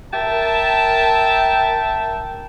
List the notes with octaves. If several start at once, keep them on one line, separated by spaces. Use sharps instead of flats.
A#4 E5 G5 A5